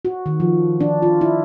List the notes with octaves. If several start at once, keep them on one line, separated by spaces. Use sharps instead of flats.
F#4
D#3
F3
D4
F4
E4